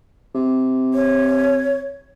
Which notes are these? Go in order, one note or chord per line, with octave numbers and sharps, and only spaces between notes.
C3
C#5